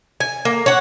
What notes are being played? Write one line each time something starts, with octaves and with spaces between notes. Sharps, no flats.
G#5
A#3
C#5 F#5